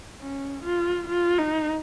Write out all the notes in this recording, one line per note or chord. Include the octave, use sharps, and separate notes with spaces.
C#4
F4
F4
D#4